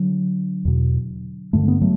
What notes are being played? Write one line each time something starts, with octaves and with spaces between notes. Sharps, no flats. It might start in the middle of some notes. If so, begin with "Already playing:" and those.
Already playing: D3 F#3
E2 B2
G2 D3 A3
B3
F#3 A3